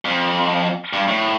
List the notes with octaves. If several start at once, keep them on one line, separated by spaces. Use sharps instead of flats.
F2
G2
A2